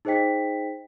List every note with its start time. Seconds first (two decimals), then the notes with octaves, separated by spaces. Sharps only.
0.05 D#4 G#4 C5 D#5 G5 B6